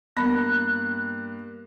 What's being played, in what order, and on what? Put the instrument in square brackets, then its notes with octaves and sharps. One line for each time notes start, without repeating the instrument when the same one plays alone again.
[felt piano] G2 A#3 A#6 [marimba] B3 B5 [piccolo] F#6